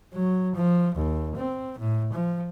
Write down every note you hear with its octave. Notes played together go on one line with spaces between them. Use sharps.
F#3
F3
D#2
C4
A2
F3